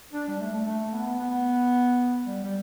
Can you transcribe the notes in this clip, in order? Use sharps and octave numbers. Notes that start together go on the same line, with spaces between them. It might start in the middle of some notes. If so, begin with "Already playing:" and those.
D4
G3
A3
A3
A3
B3
B3
G3
G3